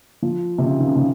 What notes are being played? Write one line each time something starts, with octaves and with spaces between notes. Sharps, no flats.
F3
C3
C#3
D#3
C#3
C3